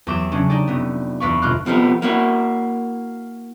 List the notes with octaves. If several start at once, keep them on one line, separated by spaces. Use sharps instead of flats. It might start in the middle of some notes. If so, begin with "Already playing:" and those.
E2 F#3 G4 D6 E7
C#3 F#3 C#4 D4
D4 D#4 G4 D5
F1 B3
E2 B4 D5 F5 B5 C#6
G1 B2 F4 D6 F6 F#6
C3 F3 A3 B3
A#3 E4 F#4